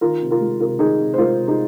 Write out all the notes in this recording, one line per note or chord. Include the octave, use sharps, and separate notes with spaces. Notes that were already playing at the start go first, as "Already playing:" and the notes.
D#3 F4 A#4
C3
F4 A#4
G#3
C3 F4 A#4
D#3 D#4 G#4
C3
C5
G#3 F4 A#4
C3
D#4 G#4